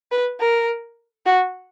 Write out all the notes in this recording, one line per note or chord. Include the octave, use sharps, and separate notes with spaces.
B4
A#4
F#4